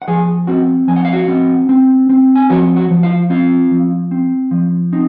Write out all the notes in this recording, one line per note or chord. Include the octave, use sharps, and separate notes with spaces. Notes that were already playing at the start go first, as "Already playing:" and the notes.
F#5
F3 G#4 G#5
C4 F#4 F#5
F3 G#5
F#5
F5
F#4 F#5
C4
C4
C4
G#5
F3 F#4 F#5
F#4 F#5
F3
F4 F5
C4 F4 F5
F3
C4
F3
C4 D#4